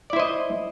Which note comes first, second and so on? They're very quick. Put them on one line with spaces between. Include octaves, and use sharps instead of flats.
D5 E4 C5 D#5